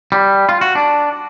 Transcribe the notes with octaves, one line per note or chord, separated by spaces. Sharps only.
G3
F4
F#4
D4